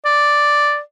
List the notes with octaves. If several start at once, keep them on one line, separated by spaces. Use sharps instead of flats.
D5